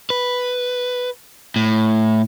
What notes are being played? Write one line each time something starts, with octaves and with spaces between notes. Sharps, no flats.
B4
A2